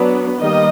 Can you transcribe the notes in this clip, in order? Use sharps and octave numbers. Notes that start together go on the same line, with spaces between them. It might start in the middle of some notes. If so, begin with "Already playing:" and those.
Already playing: F#3 B3 D4
D#3 G3 A#3 D#5